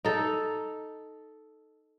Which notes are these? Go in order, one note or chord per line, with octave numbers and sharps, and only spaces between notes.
D#4 A4